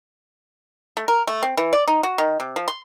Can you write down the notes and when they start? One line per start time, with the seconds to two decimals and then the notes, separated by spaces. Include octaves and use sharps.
0.97 A3
1.08 A#4
1.27 A3
1.43 C4
1.57 E3
1.73 D5
1.88 D#4
2.03 F#4
2.18 D#3
2.40 C3
2.56 F3
2.68 C6